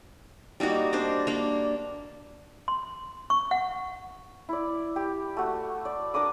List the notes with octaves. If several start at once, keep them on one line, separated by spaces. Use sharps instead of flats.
G3 A#3 D#4 F#4
D4 C5 D5
A#3 D4
C6
C#6
F#5
E4 D5
G4
A3 F#4
D5
D4 A#4 D6 D#6